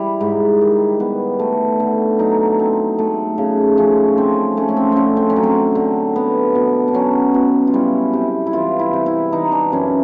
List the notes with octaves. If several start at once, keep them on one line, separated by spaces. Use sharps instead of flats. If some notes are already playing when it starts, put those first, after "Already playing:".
Already playing: G3 E4
G#2
D#3
B3
A3
D3
F#3 D#4
C4
A3
C#3
F3 C#4
C4
A3 C#4
C#4
C4
D3 C4 C#4
C4
C#4
F#3
C4
D3
B3
B2
D4
F#3 C#4
B2
F4
G3 E4
C3
E4
E3 F4
E4
C3
E4
E3 D#4
D4
F#2 C#4